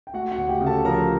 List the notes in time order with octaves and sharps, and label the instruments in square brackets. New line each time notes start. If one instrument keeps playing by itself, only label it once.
[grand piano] G5
A3 F#4 F#5
F#4 F#5
D2
G4 G5
C#3
A4 A5
F3 A#4 A#5